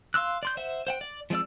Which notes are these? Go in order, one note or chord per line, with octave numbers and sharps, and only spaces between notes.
F5 C6 E6 F#6
D5 C6 G6
C5 E5 F#5
C5 F#5 G5
D5
F3 G#3 C4 D5 E6